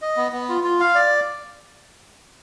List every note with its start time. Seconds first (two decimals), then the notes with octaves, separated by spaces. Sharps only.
0.02 D#5
0.17 B3
0.32 B3
0.49 F4
0.64 F4
0.80 F5
0.95 D5